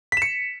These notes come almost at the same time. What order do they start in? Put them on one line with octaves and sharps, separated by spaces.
B6 E7 C#7